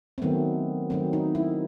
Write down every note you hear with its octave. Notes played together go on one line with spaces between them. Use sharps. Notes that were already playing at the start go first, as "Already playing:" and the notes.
C4
D#3 F#3 A3 B3
D#3 F#3 A3 C4
D#4
E4